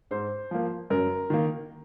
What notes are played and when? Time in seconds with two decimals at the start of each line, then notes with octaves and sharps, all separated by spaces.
0.11 G#2 C5
0.51 F3 A#3
0.90 F#2 A#4
1.30 D#3 A#3